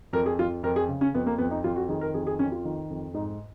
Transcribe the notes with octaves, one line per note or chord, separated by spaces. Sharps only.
F2 A#4
G#4
F2 F4
F2 A#4
G#4
C#3
C#4
F2 B3
A#3
F2 B3
D#4
F2 F4
F#4
D#3 G#4
A#4
F2 G#4
G#4
F2 C#4
F4
D#3
F2
G#2 D#4